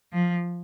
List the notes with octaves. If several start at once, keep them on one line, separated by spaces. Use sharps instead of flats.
F3